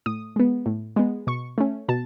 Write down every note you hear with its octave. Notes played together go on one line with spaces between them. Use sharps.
A2 D#6
G#3 B3
A2
G#3 B3
B2 C#6
A3 C#4
B2 A5